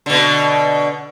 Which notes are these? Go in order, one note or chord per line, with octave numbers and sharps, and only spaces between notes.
B2 D3